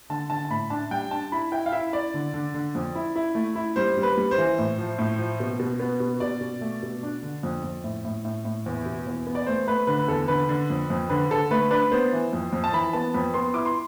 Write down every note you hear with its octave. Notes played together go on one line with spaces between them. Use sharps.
D3 A5
D3 A5
A5
A2 B5
D4 A5
G3 G5
D4 A5
E4 B5
E4 G5
F5
E4 E5
E4 D5
D3
D3
D3
F2
E4
E4
A3
E4
G3 C5
G3
B4
G3
C5
E3
A2
F3
A2
F3
B2
B2
B3
B2
B2 D5
B2
A3
B2
D4
D3
F2
F2
A2
A2
A2
A2
E2
B2
E2
B3
D5
A3 C5
A3 B4
D3 B4
B4
E2 A4
D3 B4
D3
F2
F2
D3 B4
D3 A4
A3 B4
D4 B4
B3 C5
E3
F2
F2
A5
E3 B5
B3 A5
F2 B5
B3 C6
E4 D6
C6